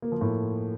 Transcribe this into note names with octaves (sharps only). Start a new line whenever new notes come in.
A#3
F3
A2